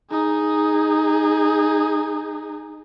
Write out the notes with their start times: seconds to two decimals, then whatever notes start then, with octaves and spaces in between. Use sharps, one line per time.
0.11 D#4 G#4